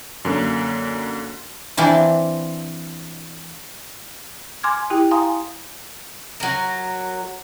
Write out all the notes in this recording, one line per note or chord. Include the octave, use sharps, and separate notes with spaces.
F#2 D3 A#3
E3 C4 D4 F4
G#5 C6 D6 F6 G#6
E4 G4 G5
F5 G#5 A#5 C6 D#6
F#3 A#4